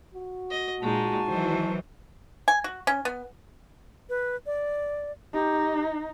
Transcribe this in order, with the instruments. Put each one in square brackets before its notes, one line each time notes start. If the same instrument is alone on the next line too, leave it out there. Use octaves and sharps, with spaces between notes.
[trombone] F#4
[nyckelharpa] D#5
[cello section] A#2 [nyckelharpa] G#3 D#4 [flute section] G#5 A5 C#6
[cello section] D#3 E3 F#3 [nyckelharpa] C5
[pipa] G#5
F#4
C#4
B3
[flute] B4
D5
[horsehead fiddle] D#4 [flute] G4